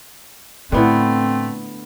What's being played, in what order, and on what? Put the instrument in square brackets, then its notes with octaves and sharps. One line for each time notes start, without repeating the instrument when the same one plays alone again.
[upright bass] A2 [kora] D3 B3 E4 [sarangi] A3 [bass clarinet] C4